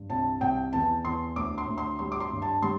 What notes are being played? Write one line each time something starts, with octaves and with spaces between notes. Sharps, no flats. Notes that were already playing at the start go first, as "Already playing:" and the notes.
Already playing: G2
C2 A5
C2 G5
E2 A5
E2 C6
D2 D6
C6
D2
C6
G3 C6
D6
C6
G2
A5
G3 C6